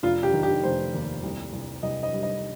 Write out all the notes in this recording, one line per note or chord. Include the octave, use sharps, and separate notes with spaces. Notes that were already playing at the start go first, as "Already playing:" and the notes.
F1 F4
G4
D#3
G4
F1 C5
D#2
C2
C2
C2 D#5
D#5
G3
D#5